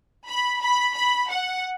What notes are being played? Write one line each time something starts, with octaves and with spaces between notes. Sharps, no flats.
B5
B5
B5
F#5